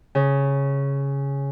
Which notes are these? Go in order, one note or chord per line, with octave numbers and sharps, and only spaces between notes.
C#3